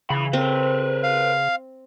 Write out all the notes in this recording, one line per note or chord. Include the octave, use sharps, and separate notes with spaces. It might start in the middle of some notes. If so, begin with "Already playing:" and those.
C#3 E3 B5
C4 A#4 B4
F5